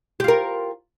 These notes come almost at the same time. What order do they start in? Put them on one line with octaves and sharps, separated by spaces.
G4 F4 A#4